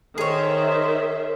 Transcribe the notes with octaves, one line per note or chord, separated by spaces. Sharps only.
D#3 G#4 C5 C#5 E5